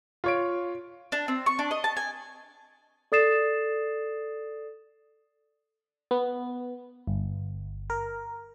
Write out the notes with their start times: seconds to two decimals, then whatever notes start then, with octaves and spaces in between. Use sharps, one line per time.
0.24 F4 C#5 D7
1.12 D4
1.28 C4
1.46 C#6
1.59 D4
1.71 D#5
1.84 A5
1.97 G#5
3.12 A4 D5 D#6 A6 C7 E7
6.11 B3
7.07 G1
7.90 A#4